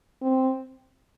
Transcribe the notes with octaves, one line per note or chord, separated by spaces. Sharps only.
C4